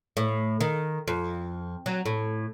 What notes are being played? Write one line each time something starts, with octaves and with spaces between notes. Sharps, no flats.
A2
D#3
F2
F#3
A2